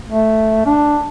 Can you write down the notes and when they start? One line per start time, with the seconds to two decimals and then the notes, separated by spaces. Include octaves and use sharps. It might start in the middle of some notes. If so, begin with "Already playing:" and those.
0.08 A3
0.66 D4